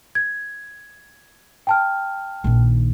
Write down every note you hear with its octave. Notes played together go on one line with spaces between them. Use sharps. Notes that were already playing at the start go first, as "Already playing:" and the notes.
G#6
G5 A5 F6
A#1 D#3